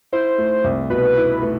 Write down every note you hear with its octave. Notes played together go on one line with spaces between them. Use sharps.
E4 C5
A3
C2
B2 B4
E4
A3